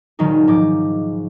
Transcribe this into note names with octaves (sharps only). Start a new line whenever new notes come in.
D#1 C#2 D#3 F#3 G#3 D#4
G#2 F3 D#4 D6